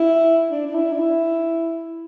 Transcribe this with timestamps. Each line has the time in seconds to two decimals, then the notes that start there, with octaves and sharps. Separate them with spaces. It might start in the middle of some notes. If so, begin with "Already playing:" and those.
Already playing: E4
0.51 D4
0.67 D4
0.75 E4
0.93 D4
0.99 E4